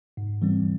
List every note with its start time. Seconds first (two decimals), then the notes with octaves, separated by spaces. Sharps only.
0.17 G#2
0.42 E3 G3 C4